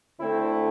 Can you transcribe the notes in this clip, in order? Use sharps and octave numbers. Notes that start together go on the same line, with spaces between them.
D2 D3 A3 C4 E4